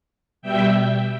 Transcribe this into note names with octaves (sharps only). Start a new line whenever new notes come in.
B2 G3 E5 G5